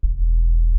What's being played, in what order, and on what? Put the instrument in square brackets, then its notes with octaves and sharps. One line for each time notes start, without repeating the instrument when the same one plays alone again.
[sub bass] E1